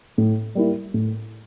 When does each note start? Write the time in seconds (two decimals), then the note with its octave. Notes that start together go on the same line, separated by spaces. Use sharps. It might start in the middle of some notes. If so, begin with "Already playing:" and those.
0.18 A2
0.55 G3 A#3 E4
0.94 A2